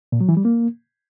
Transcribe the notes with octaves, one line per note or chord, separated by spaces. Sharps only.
A#2
F#3
E3
G3
A#3